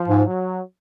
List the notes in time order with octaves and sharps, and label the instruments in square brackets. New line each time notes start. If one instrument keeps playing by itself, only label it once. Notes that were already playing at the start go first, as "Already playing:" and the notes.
Already playing: [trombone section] F3
[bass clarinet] G#2
[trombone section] F#3